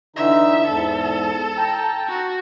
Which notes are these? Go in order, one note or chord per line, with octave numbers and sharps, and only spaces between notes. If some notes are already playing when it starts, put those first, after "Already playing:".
D3 E3 D#4 E5
E2 G#2 A4
G5 A5 A#5
F#4